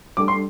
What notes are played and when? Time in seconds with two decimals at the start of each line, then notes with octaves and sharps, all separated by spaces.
0.17 G3 D4 A4 D6
0.28 C6